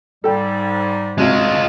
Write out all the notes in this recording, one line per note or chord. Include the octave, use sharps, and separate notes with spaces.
G#2 G3 A4 G5
G#1 C3 G#3 F4